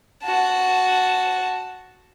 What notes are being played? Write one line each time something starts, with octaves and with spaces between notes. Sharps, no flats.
F#4 A5